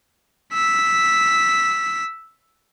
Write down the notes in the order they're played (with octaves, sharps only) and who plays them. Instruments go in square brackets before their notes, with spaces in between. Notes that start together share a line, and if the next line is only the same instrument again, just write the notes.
[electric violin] E6 B6